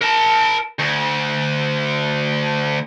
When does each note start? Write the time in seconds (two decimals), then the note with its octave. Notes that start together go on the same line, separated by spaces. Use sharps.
0.02 A#4 A5
0.79 D2